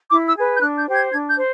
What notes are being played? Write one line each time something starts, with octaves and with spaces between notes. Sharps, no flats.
E4 D6
E6
G#4 B4
G6
D4 F#6
G6
G4 C5
G#6
D4 G#6
G6
C5